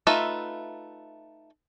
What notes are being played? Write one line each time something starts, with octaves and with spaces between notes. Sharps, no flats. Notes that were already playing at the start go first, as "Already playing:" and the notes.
A3 D#4 F4 B4 E5